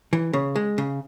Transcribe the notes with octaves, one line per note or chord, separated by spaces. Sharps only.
E3
C#3
G#3
C#3